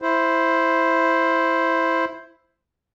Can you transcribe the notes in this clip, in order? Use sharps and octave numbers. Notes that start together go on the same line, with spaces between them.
E4 C5